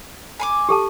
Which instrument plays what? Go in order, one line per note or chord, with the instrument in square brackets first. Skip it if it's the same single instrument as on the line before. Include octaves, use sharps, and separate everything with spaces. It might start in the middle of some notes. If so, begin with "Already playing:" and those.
[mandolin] G#5 C6 D6
[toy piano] G4 A4 A5